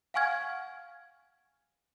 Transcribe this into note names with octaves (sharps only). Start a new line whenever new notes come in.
F5 F#5 G#5 C#6 F6 G#6